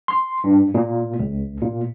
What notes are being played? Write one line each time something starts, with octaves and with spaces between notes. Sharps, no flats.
C6
G2
A#2
C#2
A#2